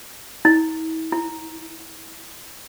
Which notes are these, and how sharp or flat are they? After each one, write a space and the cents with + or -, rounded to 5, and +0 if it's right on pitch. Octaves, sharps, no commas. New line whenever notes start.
E4 -45
E4 +10